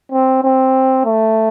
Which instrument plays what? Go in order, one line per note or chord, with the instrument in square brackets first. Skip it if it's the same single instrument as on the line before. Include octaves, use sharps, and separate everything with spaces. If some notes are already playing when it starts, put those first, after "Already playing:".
[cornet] C4
C4
A3